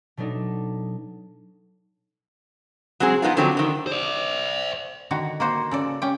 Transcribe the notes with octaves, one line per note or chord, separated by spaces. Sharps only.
B2 F#3 A3 D4 D#4
F#3 G#3 C4 G#4
F3 B3 D#4 F4
D3 F3 F#3 C4
D3 D#3
C5 D5
D3 D#3 F#4
A#3 F#4 C5
C#3 A4 D5
C#4 G4 G5